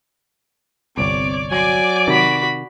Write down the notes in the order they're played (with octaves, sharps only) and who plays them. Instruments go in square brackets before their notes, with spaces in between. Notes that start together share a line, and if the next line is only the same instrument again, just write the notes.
[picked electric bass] G1 C2 [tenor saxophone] C4 [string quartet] C#5 D5 D6
[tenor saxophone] F#3 [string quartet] D5 D6 [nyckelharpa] G#5
[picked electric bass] C3 D#3 [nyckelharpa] F#4 B5